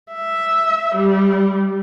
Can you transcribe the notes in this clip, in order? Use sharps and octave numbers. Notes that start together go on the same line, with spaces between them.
E5
G3